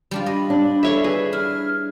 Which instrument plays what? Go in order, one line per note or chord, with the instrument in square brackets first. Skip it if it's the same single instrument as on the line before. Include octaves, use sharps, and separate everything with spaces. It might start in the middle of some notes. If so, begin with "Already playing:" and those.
[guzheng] G3 D4 F4
[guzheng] D#5 [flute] B5
[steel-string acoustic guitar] D4
[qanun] A4 C#5 E5
[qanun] G#4 [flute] B4
[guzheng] E4 [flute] F6